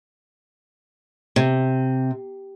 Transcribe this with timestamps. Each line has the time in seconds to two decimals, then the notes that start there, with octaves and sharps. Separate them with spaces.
1.36 C3